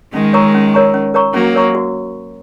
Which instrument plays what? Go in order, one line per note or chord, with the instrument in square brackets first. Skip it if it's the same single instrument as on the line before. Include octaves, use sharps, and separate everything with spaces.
[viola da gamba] D#3 G#3 [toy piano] C#4
[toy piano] A#4 C#5 A#5 C#6
C#4
A#4 C#5 A#5 C#6
C#4
A#4 C#5 A#5 C#6
[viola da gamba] F#3 A#3 [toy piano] C#4
[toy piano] A#4 C#5 A#5 C#6
F#4